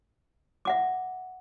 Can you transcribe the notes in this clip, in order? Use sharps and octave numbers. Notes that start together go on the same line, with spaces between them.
E5 F#5 D6